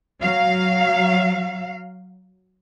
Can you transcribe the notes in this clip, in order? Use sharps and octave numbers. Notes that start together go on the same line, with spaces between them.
F#3 F5